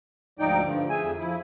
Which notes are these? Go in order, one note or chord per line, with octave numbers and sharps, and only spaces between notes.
D2 G#2 F3 D#4 D5 G5
G2 D3 F3
G#4 E5 G#5
F2
F3 E4